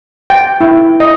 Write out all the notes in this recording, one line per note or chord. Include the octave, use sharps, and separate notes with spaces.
G5
E4
D#5